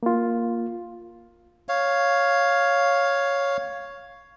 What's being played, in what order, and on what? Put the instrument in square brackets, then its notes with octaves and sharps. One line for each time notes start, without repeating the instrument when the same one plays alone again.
[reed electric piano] A#3 F4
[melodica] C#5 F5